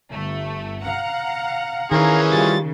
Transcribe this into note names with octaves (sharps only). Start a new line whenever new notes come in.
G1 A3
F5 F#5 A#5
D#3 E3 C#4 G#4 A#4 F5 A#5
C#3 G3 F4 A6